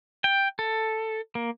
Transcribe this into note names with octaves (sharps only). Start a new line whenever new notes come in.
G5
A4
A#3